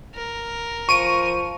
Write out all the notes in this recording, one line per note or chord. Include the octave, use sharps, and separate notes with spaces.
A#4
F3 C#6 D7 D#7